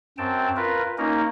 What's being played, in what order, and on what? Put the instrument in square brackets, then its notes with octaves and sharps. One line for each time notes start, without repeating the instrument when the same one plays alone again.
[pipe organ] F#2 C4 G5 A5
F4 A#4 B4
A#3 C#4 D#4 A#4